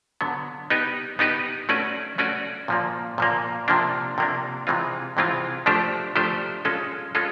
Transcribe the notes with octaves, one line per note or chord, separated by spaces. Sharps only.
D3 F#3 B3
B3 D#4 G4 B4
B3 D#4 G4 B4
A3 C#4 F#4 B4 D5
A3 C#4 F#4 B4 D5
A#2 F3 A#3
A#2 F3 A#3
C3 F3 A#3 D4
C3 F3 A#3 D4
C3 E3 G#3 C4 F4
C3 E3 G#3 C4 F4
F3 A3 D4 G4 C5
F3 A3 D4 G4 C5
G#3 C#4 F4 A4
G#3 C#4 F4 A4